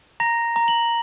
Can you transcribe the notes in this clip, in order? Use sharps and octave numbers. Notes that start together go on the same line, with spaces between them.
A#5 A#6
A#5
F#7